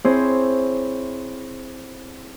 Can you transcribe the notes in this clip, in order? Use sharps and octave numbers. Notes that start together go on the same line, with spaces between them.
C4 E4 G#4 C5 C#5